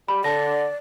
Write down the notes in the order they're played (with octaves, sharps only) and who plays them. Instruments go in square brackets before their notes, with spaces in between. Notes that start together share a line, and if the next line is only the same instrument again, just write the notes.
[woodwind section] G3 [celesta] B5
[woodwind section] D3 [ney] D5 [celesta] A5 A#6